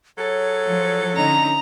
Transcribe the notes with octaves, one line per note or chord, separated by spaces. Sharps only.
F#3 G#4 A4 C#5
F3
D3 C#4 D#4 A#5